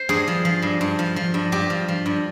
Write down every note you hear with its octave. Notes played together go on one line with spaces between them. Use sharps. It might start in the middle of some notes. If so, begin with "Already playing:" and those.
Already playing: C5
G2 G#4
F3
F3
G2
G2
F3
F3
G2
G2 G4
F3
F3
G2